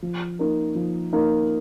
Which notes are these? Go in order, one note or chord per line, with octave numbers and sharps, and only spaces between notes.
F3
A#3 D#4 A#4
F3
A#3 D#4 A#4